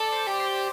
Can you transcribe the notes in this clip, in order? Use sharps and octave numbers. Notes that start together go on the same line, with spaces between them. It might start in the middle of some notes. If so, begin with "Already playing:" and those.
Already playing: A4 D5
C5
G4
C5